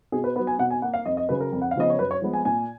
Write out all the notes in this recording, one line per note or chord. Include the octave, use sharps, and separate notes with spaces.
B2 G#4
B4
F#3 B3 B4
G#5
B2 F#5
G#5
A#3 F#5
F5
F2 D#5
D#5
C#3 F#3 B4
A#4
F2
F#5
F5
C#3 F3 B3 D#5
C#5
F#2 B4
C#5
F3 G#3 B3
G#5
A#2 G#5